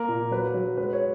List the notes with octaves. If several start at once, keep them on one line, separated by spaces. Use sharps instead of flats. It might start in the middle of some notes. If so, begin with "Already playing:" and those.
Already playing: A#3 A#4
A#2
F#3 B4
F#3
G#3 B4
C#5